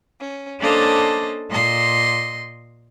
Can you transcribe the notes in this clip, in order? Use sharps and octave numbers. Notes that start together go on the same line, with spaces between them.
C#4
A#3 C#4 D4 A4 C5 D#5
A#2 D#5 C6